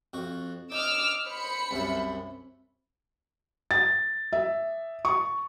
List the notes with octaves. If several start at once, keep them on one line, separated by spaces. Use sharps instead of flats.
F2 F#4
D#4 D6 E6 F6
C5 B5 C#7
C2 F#2 E5
A6
E5
C#6